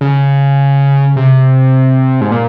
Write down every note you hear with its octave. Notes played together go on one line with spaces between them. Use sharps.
C#3
C3
G#2
A#2